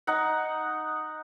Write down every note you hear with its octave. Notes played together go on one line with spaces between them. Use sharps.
D#4 F#5